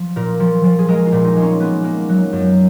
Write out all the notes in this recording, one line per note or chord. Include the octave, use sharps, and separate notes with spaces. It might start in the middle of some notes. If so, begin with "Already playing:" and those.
Already playing: F3
A#2 A#4
F3
F3
G#4
G#3 A#4
F4
A#2
D#4
G#3
C#4
A#3 B3
A#3
F#3
F#2